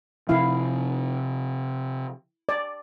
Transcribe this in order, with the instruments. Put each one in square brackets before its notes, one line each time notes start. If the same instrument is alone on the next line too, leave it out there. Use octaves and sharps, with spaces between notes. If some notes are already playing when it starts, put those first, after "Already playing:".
[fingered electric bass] C3 F3 [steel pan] E4 F5
[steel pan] D5